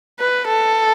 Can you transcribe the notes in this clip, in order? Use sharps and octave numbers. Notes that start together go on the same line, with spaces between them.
B4
A4